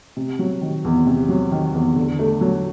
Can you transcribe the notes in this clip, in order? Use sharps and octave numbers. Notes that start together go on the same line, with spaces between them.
C3
F#3
D#3
E2
C3
F#3
D#3
E2
D3
A3
F#3